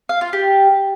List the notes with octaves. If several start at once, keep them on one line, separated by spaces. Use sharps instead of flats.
F5
F4
G4